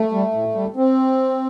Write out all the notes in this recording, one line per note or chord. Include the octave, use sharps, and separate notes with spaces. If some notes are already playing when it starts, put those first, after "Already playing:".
Already playing: A3
G3
A2
G3
C4